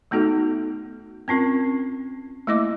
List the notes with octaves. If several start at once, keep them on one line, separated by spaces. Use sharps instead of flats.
A3 B3 D#4 F#4 A4
C4 C#4 F4 A#4
A3 A#3 E4 D#5 E5 D6